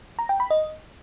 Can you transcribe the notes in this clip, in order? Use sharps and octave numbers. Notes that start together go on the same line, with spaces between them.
A#5
G5
B5
D#5